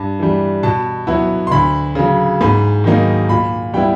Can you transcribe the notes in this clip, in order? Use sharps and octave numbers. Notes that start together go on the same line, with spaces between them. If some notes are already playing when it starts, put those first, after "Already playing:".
Already playing: G2 A5
E3 G3
B2 A5
F#3 B3 E4
C6
D2 B5
C#3 F#3
G#2 B5
D#3 F#3 A#3 D#4
A#2 B5
G3 B3 E4 G5